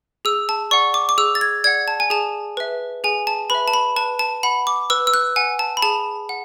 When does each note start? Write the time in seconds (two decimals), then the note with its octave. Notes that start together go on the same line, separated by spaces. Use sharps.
0.25 G#4 E6
0.49 A5
0.71 D5 F#5 C#6
0.94 D6
1.09 D6
1.18 G#4 E6
1.35 A6
1.41 G#6
1.64 D5 F#5 G#6
1.88 A5
2.00 G#5
2.10 G#4 A5
2.57 B4 E5
3.04 G#4 G#5
3.27 A5
3.50 B4 E5 B5
3.68 A5
3.73 B5
3.96 B4 A5
4.19 A5
4.43 F#5 B5
4.67 D6
4.90 B4 E6
5.07 E6
5.14 F#6
5.36 F#5 G#5
5.59 A5
5.77 B5
5.82 G#4 A5
6.29 F#5